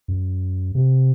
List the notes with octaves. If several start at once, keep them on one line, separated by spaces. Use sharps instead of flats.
F#2
C3